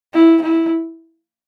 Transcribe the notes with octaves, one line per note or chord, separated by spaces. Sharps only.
E4
E4